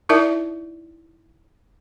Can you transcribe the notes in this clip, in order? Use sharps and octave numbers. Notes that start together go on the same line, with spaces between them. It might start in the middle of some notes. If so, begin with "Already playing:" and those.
D#4 E4 A#4 D5 E5 A5